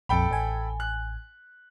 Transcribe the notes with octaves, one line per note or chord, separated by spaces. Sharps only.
A#1 F2 A4 G5 B5
A1 G#5
F#6